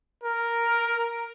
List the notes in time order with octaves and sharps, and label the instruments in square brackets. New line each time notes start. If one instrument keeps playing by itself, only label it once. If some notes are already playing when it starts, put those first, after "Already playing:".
[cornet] A#4